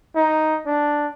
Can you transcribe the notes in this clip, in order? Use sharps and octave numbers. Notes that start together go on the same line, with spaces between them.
D#4
D4